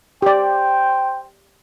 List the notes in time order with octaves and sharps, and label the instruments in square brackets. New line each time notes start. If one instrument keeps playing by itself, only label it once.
[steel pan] G4 D5 [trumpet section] C5 G5